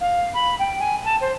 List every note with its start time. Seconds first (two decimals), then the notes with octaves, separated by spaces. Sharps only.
0.01 F5
0.34 B5
0.59 G5
0.80 G#5
1.05 A5
1.21 C5